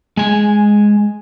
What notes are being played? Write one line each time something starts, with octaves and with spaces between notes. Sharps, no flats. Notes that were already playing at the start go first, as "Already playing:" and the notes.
G#3 G#5